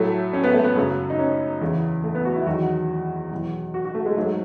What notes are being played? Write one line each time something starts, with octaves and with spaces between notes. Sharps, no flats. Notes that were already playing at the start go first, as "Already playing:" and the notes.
Already playing: A2 F#3 A3
C#4
B3
A3
B3
F#2 C#3 F#3
D#4
C#4
E2 C#3 E3
A3
B3
F#4
E4
E2 D#3 F#3 F#4
E2 B2 F#3
F#4
F#4
A3
G#3
G#2 F#3 A3